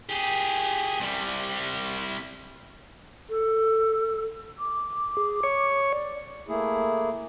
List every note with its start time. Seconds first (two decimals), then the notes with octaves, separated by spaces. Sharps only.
0.09 G4 G#4
1.00 C2 G3
3.30 A4
4.59 D6
5.17 G#4
5.43 C#5 C#6 C#7
5.91 D5
6.48 A3 A#3 E4 G#4